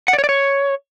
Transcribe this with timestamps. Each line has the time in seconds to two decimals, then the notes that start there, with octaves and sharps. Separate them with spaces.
0.08 F#5
0.13 D5
0.19 C#5
0.24 D5
0.29 C#5